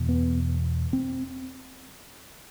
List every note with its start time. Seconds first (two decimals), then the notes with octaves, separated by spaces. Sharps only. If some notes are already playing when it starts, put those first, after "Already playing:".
Already playing: E2 B2
0.09 B3
0.93 C4